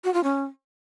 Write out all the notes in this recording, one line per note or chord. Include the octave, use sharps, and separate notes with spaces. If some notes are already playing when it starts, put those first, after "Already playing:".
F#4
F4
C#4